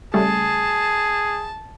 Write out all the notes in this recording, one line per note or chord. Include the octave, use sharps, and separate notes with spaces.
C#3 G3 A3 G#4 A5